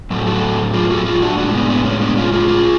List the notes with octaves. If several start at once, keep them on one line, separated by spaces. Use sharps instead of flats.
A2 F#3 A3
F#4 A4
F4 G#4
F#4 A4
F4 G#4
D4 F#4
A2 G#3 D4 F#4
B3 D4
B3 D4
C#4
B3 D4
C#4 F4
F4 G#4
F4 G#4